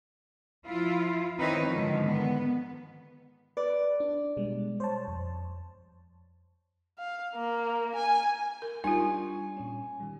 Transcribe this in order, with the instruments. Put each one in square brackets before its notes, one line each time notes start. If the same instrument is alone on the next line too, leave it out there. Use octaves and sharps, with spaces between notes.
[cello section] F3 E4 F4
D#3 C4 D#4 E4 B4 C#5
G#2 D3 D#3 F3
B3
[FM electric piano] B4 [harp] D5
[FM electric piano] D4
B2 G3 G#3
C5 C#5 A5
F2
[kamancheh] F5
A#3
G#5
[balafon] A#4
[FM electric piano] G3 D4 C#6 [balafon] D#4 F4 [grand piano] G#5
[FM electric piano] A#2 C#4
D#3 G3